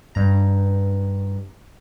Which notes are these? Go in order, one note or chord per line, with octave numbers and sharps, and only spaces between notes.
G2 A#5